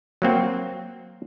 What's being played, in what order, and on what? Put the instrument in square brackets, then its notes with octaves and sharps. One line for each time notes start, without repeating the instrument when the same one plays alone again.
[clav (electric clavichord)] F#3 A#3 C4 F#4